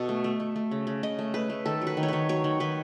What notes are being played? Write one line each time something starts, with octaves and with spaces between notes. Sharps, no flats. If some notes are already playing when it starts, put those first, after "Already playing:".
Already playing: B2 A4
A3
A3
A3
A3
C#3
C#3
C#3 D#5
A3
A3 B4
A3
D#3 A4
F#3
B4
D#3
C#5
D#3 B4
F#3 C#5
D#3
D#3 B4